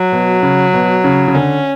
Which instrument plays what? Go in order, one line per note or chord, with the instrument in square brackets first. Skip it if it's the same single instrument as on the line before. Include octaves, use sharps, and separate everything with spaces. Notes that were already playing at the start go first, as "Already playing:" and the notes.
Already playing: [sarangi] F#3
[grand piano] B2
C#3
B2
C#3
C#3
[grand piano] D3 [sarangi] C#4